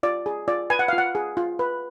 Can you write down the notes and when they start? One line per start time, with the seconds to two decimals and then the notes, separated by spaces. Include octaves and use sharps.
0.03 F4 D5
0.26 G#4
0.48 F4 D5
0.70 B4 G#5
0.79 F#5
0.88 F5
0.93 F4
0.98 F#5
1.15 G#4
1.37 F4
1.59 B4